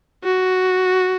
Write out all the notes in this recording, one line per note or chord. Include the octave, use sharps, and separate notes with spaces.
F#4